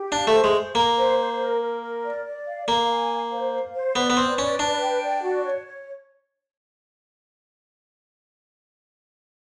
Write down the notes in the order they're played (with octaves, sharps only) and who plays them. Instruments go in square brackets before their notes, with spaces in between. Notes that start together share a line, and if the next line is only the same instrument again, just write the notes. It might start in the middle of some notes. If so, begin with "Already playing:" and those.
Already playing: [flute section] G4
[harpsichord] D4 [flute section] F5
[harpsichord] A3
[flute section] C5
[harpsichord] G#3
[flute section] C5
[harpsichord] A#3 [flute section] A#5
[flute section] C5
C5
A#4
A#4
A#4
D5
D5
F5
[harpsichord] A#3 [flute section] F5
[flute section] G#5
F5
C5
F5
C5
[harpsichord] B3 [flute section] D5
[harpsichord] B3
[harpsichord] C4 [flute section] B4
[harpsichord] C#4 [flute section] D5
[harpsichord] D4 [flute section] B4
[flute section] G5
D5
F#4
C#5
C#5